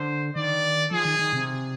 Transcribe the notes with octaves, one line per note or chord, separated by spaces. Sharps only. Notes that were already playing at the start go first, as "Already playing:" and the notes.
Already playing: D3 C5
D#3 D5
F3 G#4
D#3
D#3
C3